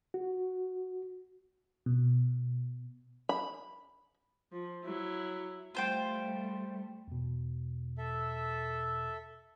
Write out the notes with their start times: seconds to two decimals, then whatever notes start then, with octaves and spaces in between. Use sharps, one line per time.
0.14 F#4
1.86 B2
3.29 B5
4.52 F3
4.85 F#3 E4
5.75 G3 A3 F4 C5 G5
7.08 E2 B2
7.98 A4 E5